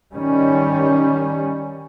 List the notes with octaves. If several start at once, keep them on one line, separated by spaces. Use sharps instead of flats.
D#3 G3 C#4